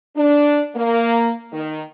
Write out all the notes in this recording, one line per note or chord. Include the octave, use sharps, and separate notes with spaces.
D4
A#3
D#3